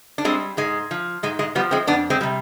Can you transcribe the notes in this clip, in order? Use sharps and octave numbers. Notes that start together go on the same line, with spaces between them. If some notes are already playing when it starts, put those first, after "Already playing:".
D4
G3 G#3 C4
G#2 G#3
F3
G#2 G#3
G#3
F3 G3 B3
G#3 C4
F2 B3 D4
G#3 C4
C3 G3